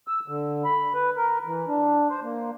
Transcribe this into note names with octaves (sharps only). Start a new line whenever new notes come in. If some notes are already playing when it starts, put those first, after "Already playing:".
E6
D3
B5
B4
A#4
E3
D4
C5
A#3